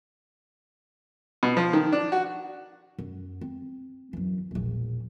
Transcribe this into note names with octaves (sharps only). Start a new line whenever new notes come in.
B2
F3
D#3
D4
F#4
F#2
C4
F#2 E3
E1 A#1